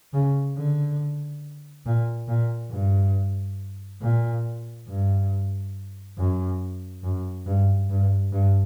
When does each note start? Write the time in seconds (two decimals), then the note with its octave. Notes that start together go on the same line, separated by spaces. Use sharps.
0.13 C#3
0.56 D3
1.86 A#2
2.28 A#2
2.71 G2
4.01 A#2
4.88 G2
6.18 F#2
7.03 F#2
7.46 G2
7.90 G2
8.32 G2